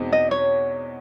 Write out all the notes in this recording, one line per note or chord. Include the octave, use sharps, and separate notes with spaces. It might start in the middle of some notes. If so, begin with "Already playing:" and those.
Already playing: E2 B2 G#3 C4 D#4
D#5
C#5